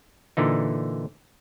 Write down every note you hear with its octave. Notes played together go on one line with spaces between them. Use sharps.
A#2 D3 E3 D#4